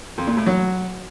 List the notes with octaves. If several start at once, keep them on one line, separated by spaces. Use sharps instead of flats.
F2
A#2
A2
F#3